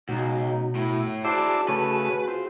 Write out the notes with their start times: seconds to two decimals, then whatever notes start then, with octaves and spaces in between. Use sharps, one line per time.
0.09 C#2 B2 D#4 F#4
0.75 A2 E4
1.25 D4 E4 F#4 G#4 C5 D5 A5
1.68 C#3 A3 B4
2.28 C4 F4